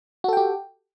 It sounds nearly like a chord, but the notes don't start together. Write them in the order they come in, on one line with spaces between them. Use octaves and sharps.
F#4 A4 G5 G4